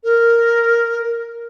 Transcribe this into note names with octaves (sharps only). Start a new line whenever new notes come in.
A#4